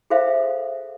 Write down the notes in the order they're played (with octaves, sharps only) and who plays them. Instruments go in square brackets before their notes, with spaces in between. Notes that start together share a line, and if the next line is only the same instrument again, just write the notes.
[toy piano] G#4 A4 C5 E5 F5